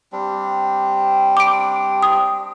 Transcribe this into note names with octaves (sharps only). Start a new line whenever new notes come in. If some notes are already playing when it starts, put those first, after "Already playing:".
G3 C4 D4
D6 D7
D#6